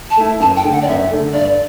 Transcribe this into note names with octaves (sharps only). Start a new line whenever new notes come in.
A5
A3 E4
F#2 A5
G5
D3 A3
F#5
D5
F#2 E5
D3 A3
G2 D5